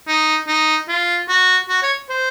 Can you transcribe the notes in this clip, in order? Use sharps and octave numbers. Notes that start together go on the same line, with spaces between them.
D#4
D#4
F4
F#4
F#4
C#5
C5